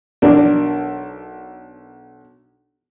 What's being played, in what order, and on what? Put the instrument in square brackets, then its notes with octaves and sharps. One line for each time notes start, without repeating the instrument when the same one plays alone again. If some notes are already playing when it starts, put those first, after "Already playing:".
[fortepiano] B1 D4 A#4